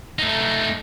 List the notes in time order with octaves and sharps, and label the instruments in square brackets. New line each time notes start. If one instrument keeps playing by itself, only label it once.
[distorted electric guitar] A3 D#4